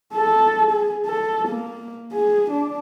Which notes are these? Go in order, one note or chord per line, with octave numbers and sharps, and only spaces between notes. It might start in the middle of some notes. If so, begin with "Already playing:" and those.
A4
G#4
A4
A#3
G#4
D4